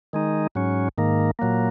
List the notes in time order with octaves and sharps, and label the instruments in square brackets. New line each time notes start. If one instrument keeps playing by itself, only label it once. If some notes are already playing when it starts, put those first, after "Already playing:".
[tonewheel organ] D#3 G#3 D#4
G#2 F#3 C#4
G#2 D#3 A#3
A#2 F#3 A#3